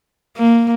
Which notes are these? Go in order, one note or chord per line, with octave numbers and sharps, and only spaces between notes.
A#3